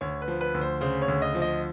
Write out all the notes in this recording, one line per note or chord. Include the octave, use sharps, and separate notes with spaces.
D2 C#5
B4
F3
B4
D2
C5
C#3 C5
C#5
D2
D#5
F3
D#5